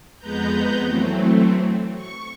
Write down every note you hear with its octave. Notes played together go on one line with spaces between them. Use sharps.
F2 G#3 B3 B4 A#5 G6
E3 F#3 A3 C4
C#6